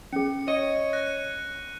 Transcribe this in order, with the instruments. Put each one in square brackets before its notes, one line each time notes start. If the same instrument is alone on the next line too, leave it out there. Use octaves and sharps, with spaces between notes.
[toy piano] C#4 G#4 [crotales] C#7
[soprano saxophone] C#5 [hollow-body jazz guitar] D#5 [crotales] D#7
[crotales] F#6 A#6